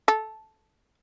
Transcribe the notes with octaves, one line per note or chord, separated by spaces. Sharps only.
A4